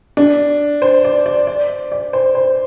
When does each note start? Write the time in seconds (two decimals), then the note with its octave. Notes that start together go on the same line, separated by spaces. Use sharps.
0.17 D4
0.82 C5
1.05 D5
1.26 D5
1.47 D5
1.92 D5
2.13 C5
2.35 C5